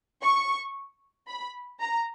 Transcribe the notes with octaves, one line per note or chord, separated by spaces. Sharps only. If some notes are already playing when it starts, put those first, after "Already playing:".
C#6
B5
A#5